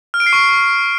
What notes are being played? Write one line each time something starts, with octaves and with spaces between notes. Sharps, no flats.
F6
D7
C7
C#6